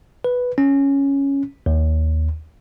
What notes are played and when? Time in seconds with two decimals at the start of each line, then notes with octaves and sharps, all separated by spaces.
0.24 B4
0.58 C#4
1.66 D#2